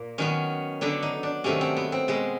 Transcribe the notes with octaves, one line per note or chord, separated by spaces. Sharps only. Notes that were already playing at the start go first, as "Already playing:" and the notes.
Already playing: A#2 A#3
D#3 F#3 B3 C#4
D3 F#3 B3 D4
D#4
D4
C3 D#3 F#3 A3 C#4
C4
B3
C4
B2 G#3 B3